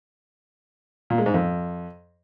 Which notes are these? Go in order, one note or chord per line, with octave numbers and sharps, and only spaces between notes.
A#2
G#3
G#2
F2